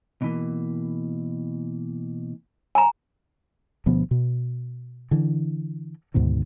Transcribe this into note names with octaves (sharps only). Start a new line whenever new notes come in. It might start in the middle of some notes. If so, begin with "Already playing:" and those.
B2 E3 A#3
G#5 A#5
D2 B2 F3 B3
B2
D3 E3
D2 G#2 B2 D#3